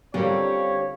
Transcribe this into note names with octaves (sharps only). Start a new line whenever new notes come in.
D3 G3 C4 C#4 F4 G4 A#4 C#5